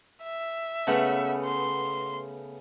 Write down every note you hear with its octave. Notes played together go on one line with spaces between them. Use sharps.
E5
C#3 A3 B3
C6